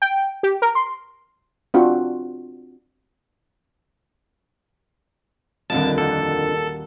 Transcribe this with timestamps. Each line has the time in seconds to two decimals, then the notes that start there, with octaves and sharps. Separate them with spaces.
0.02 G5
0.43 G4
0.62 A#4
0.75 C6
1.74 C4 D4 F4 F#4
5.70 D#1 F2 D3 B3 E5 A5 A6
5.98 A#3 F#4 A4